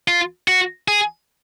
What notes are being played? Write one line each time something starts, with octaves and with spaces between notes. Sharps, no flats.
F4
F#4
G#4